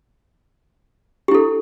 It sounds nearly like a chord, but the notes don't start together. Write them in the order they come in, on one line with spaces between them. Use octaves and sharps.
G4 E4 A4